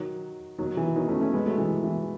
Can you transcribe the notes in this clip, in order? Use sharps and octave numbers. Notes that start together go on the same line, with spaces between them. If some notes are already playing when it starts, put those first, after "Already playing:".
Already playing: D#3 F#3
D#3 F#3
E3
D#3 F#3
A3 C#4
A3 C#4
G#3 B3
F#3 A3
E3 G#3
E3